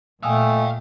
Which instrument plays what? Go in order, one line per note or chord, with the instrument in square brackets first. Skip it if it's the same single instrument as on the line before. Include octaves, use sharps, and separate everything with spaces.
[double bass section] A#2 [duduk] A3 [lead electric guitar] F5 G5 [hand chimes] G#5 D#6 E6